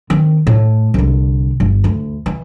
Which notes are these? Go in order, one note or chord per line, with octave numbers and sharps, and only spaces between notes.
D#3 C4
A2
C2 D3
G1
D2
E3